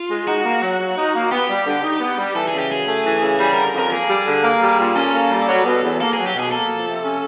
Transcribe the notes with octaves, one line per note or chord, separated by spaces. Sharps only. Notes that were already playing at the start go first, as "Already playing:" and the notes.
Already playing: F4
G#3
D#4 F#4
A#3
F#3
F#3
D#4
A#3
B3 G4
G3
D3
D#4
B3
G3
E3 A4
C#3 G#4
G4
F#2 G#4
A3
E3
C#3
G3 G#4
D3 A#4
F2 A#4
A#3 G#4
G3
D3
A#3
G3
A#2
C#4 A4
A#3
G3
F#3
B2
E2
A#3 A4
F#3 G#4
G4
B2 G#4
A#3 A4
F3
C3
C#4